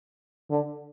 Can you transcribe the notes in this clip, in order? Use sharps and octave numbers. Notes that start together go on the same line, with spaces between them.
D3